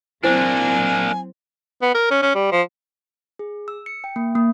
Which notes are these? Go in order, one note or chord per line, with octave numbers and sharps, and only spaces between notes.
F#3 A#3 C4 D4 E4 C5 G#5
B3
A#4
C#4
C#4
G3
F3
G#4
E6
C#7
G5
A#3
A#3